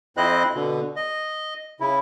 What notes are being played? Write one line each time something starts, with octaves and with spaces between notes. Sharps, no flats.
F2 C4 E4 C5 D#5 F#6
B2 D3
D#5
C#3 E4